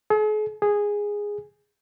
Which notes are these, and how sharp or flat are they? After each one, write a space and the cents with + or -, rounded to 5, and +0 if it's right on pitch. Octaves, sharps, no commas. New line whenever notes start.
G#4 +45
G#4 -10